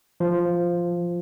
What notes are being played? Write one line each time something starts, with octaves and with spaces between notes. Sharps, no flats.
F3